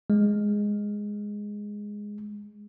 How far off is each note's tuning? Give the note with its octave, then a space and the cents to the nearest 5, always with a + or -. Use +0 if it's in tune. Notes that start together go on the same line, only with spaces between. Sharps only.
G#3 -5